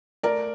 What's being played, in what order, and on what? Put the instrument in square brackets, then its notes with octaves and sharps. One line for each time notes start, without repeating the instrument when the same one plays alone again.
[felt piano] A3 A#4 D5